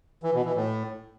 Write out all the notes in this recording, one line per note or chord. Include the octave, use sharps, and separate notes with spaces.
E3
B2
E3
A2